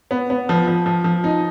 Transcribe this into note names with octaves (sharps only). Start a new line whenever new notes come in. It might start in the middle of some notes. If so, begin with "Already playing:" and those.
B3
B3
F3
F3
F3
F3
D#4